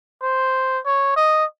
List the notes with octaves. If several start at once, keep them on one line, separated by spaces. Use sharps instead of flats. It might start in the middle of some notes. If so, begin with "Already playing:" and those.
C5
C#5
D#5